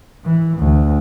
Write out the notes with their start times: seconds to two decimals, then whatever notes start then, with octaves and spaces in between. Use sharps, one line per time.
0.24 E3
0.58 D2